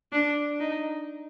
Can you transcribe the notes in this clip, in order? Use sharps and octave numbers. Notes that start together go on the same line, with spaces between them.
D4
D#4